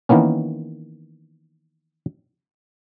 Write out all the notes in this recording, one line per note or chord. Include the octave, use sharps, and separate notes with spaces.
D#3 E3 A#3 B3 C#4